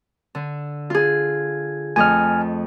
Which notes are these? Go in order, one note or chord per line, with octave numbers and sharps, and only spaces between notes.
D3
F4 G#4
F2 A3 D#5 G#5 F6